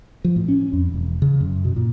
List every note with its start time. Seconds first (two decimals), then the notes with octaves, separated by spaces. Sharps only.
0.25 F3
0.36 A2
0.48 C#4
0.73 F2
0.94 E1
1.22 C#3
1.41 F#2
1.65 B2
1.76 A#2